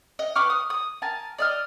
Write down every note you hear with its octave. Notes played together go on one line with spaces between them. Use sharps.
D#5
B4 C#6 D6 F6
D#6
D#6
A#4 G#5 A5
D5 D#5 F6